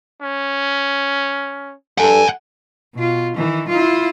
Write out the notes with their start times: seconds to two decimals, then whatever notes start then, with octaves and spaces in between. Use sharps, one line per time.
0.22 C#4
1.98 G2 A4 F#5 G#5
2.95 B2 F4
3.36 D#3 E3
3.69 E4 F4